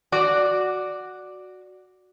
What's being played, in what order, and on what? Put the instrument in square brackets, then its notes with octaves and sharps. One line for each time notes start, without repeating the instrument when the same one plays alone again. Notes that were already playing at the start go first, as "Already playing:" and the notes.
[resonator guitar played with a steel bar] F#4 D5